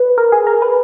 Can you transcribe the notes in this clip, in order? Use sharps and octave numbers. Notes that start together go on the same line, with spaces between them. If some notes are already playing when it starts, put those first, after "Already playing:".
Already playing: B4
A#4
G#4
A#4
B4